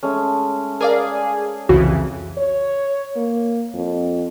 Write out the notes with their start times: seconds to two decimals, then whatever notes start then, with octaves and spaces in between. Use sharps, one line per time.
0.03 G#3 A3 C#4
0.81 G#4 A#4 D5 F5
1.69 C2 F2 C#3 E3 F#4
2.38 C#5
3.16 A#3
3.74 F2